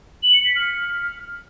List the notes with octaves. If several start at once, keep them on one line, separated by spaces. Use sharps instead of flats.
F#7
C#7
B6
F6